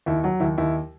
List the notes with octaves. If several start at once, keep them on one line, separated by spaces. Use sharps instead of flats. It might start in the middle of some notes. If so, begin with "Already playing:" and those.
D#2 E4
F#3
D#2 E4
D#2 E4